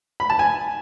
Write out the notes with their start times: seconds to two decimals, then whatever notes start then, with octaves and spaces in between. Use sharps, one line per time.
0.20 B5
0.30 A5
0.39 G#5